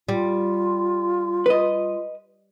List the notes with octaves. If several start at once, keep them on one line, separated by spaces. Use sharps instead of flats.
G3 F4
B4 D#5